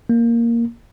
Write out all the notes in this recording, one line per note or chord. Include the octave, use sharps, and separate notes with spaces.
A#3